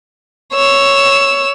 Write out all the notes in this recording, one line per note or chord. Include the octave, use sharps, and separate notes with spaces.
C#5 E6